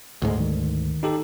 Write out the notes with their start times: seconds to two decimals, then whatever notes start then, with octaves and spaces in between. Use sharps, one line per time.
0.22 D2 G#2 G#3
0.41 D#3
1.03 D#4 G4 A4